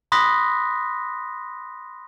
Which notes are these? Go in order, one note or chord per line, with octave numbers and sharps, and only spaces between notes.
B5 C6 D#6 F#6 A#6 B6